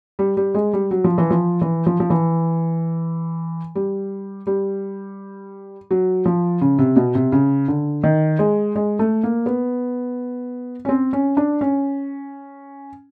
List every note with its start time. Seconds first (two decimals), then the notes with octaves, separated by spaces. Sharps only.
0.19 G3
0.37 G3
0.55 G#3
0.73 G3
0.91 F#3
1.04 F3
1.18 E3
1.30 F3
1.61 E3
1.86 F3
2.00 F3
2.10 E3
3.75 G3
4.47 G3
5.91 F#3
6.26 F3
6.61 C#3
6.79 C3
6.96 B2
7.15 C3
7.32 C#3
7.68 D3
8.03 D#3
8.39 G#3
8.76 G#3
8.99 A3
9.23 A#3
9.46 B3
10.85 C#4
10.89 C4
11.13 C#4
11.37 D4
11.61 C#4